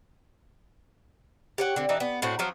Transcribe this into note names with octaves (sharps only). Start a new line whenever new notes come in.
G4 C#5 F#5
D3 C4
E3 D4 D#4
B3
A2 C4 F#4
F3 F#3 C#4